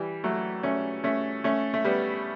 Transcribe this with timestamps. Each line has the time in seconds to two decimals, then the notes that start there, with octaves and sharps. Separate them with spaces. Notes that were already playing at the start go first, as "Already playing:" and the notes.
Already playing: E3 G3
0.24 F#3 A3
0.63 A3 C#4
1.04 A3 C#4
1.44 A3 C#4
1.74 A3
1.85 G3 B3